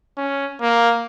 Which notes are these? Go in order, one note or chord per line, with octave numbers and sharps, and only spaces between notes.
C#4
A#3